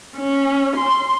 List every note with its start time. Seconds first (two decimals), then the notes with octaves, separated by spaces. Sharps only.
0.17 C#4
0.76 C6